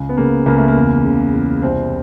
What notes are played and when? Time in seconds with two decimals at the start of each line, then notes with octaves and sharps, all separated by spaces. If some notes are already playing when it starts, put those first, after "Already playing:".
Already playing: C#2
0.09 B3
0.17 C#3 A#3
0.46 C#2 A#3
0.58 A3
0.68 A#3
0.76 E2
1.04 C#3
1.33 E2
1.62 C2 C4